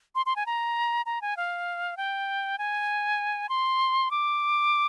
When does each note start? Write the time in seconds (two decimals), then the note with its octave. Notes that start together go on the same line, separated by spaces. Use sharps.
0.15 C6
0.26 C6
0.36 G#5
0.46 A#5
1.06 A#5
1.22 G#5
1.37 F5
1.97 G5
2.58 G#5
3.49 C6
4.11 D6